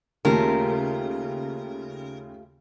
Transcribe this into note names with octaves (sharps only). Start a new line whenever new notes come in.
D#2 C#3 A3 F4 G4 A#4